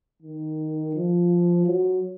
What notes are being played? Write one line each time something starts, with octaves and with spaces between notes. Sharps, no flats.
D#3
F3
F#3